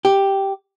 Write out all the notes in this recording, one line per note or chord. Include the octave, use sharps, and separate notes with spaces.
G4